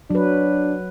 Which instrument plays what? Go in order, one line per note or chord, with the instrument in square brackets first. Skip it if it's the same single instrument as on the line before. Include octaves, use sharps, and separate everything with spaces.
[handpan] F#3 B4 [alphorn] D4